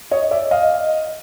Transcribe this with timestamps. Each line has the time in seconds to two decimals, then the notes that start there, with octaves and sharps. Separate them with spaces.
0.11 C#5 D#5
0.31 D5 E5
0.51 D#5 F5